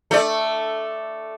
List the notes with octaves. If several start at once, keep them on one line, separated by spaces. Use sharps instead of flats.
A3 D5